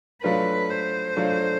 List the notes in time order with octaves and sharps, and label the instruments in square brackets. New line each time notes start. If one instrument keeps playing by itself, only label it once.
[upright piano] F#3 A3 D4 F4 [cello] B4
[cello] C5
[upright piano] F#3 A3 D4 F4